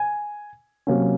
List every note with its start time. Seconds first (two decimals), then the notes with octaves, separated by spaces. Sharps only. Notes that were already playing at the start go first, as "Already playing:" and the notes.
Already playing: G#5
0.87 C3 F#3 A#3 C#4